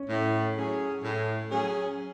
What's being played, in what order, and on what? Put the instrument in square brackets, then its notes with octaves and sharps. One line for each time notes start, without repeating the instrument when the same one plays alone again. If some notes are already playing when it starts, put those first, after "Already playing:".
Already playing: [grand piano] C#4
[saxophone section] A2
F#3 C#4 G#4
A2
F#3 C#4 G#4